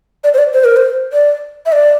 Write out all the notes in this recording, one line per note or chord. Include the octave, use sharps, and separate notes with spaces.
D5
C5
D5
C5
A#4
C5
D5
E5
D5